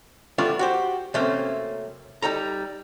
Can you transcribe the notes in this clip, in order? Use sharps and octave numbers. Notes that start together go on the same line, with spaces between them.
G3 A3 B3 D4 E4 F4
F#4 G4 C5
C3 F#3 A3 A#3 C4 C#4
G3 D#4 A4 A#5